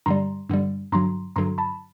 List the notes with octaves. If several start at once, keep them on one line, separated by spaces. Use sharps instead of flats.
G2 D3 G3 A#5 C6
G2 D3 G3
G2 D3 F#3 A#5 C6
G2 D3 F#3 A#5 C6
A5 B5